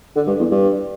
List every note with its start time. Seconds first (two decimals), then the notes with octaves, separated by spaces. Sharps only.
0.16 D3
0.27 G2
0.39 E2
0.51 G2